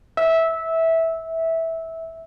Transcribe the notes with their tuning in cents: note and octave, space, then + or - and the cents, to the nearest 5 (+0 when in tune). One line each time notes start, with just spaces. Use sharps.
E5 -15